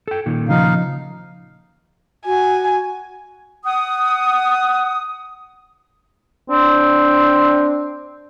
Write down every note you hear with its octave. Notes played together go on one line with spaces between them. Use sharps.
A4 G5
A#2 D#3
C#3 F3 D#4 F5
F#4 G#5
F#5 D#6
C4 D4